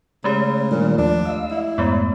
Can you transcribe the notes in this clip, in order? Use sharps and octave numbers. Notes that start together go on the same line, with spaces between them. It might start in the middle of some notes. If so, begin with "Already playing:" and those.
C#3 G#3 A3 G4
A#2 D#3 G3 D4
D#2 F3 D4 D5
D#5 F5 E6
E4
F2 G#2 G#3 A3 B3